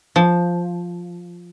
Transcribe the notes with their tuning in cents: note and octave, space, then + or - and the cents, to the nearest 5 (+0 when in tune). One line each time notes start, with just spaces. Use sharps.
F3 +0